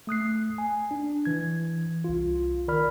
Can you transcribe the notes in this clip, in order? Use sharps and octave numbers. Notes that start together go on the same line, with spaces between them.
A3 D#6 F#6 C7
G#5
D4
E3 G#6
C2 F4
D#3 A#4 D5 B5 F6